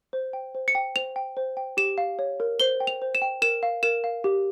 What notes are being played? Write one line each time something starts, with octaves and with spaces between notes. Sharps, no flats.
C5
G5
C5
C#7
G5
C5 F7
G5
C5
G5
G4 E7
F5
C#5
A#4
C5 G7
G5
F7
C5
E7
G5
A#4 E7
F5
A#4 E7
F5
G4